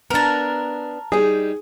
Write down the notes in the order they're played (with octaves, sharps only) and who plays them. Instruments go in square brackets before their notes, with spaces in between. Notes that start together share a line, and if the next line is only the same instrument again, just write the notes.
[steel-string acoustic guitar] B3 D4 [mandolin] A#4 A5
[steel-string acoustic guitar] G3 D#4 [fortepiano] G#4